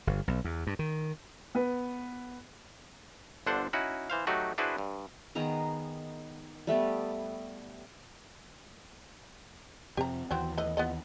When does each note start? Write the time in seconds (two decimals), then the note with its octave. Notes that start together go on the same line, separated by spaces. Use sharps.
0.07 G1
0.28 B1
0.45 E2
0.67 G2
0.79 D#3
1.55 B3 B4
3.46 G1 D3 D4 C5 F#5
3.73 C#4 D#4 E4 F#4
4.10 E3 C5 F5
4.27 F#3 A3 D#4 F#4 G4
4.58 D4 E4 F#4 G#4 B4 C5
4.78 G2
5.35 D#3 B3 G#4 A#5
6.67 G3 A3 B3 D5
9.97 F2 C3 C4 G4 A#5
10.31 D#2 E3 F#3 B3 C4
10.58 A3 B4 D#5
10.77 B3 F4 D#5